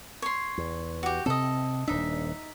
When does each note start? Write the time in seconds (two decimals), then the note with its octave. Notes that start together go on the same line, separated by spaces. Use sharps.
0.22 C#5 C6
0.58 E2
1.03 F#4 G4
1.26 C3 C4 A4 D#5
1.88 D#1 D4 D#4 E5